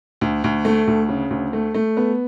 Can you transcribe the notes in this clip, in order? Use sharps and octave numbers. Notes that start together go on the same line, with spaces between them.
D2
D2
A3
D2
C#3
D2
A3
A3
B3